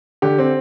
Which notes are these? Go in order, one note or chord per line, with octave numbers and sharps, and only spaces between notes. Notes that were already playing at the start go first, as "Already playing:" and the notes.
D3 G4
C4